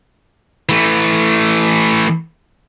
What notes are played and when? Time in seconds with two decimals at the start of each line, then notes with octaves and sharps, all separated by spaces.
0.69 E3 A3